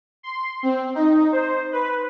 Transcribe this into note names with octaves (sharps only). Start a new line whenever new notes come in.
C6
C4
D#4
C5
B4